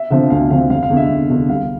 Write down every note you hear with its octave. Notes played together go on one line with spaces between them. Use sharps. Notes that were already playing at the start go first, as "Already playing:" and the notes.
Already playing: E5
D3 F3 C4 E5
D2 F5
D3 F3 C4 F5
F1 F5
F5
E2 D3
E5
F1
E2 D3
C2 F5